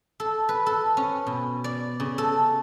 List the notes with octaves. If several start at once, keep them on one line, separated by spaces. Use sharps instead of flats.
A4
B4
A4
C#4
B2
D5
C#3
A4